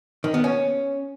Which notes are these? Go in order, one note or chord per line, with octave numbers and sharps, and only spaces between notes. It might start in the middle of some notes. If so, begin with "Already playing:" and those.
D#3
B3
C#4